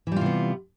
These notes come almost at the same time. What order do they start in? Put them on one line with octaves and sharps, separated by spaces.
E3 G3 F4 C3 B3